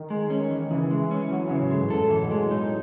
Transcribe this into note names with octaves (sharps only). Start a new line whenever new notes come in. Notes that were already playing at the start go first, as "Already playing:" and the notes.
Already playing: D#3
G#3
C#4
E2
C#3 E3
G#3
E3
C#4
E2 F#3
E3
C#3
A2
G#3
G#2
F#2 A4
A2 E3
B2
G#3
B2
A2 D#4